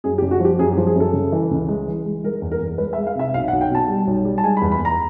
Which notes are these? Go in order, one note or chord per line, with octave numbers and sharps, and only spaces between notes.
F#2 G#4
G4
F#1
F#4
F3 G4
F#2 G#4
G4
F3
G#4
F#2 A4
C#3
E3
C#2
G#3
E3
G#3
G#3 A#4
E2
A#4
E2
G#3 B4
E5
G#3
F5
C3 E5
B1 F5
F#5
B1
G5
B2 A5
G3
B1
G3
A5
G#3 G#5
B5
E2
B5
E2
A#5